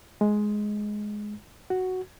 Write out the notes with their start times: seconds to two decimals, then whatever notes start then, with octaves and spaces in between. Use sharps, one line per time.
0.21 G#3
1.70 F#4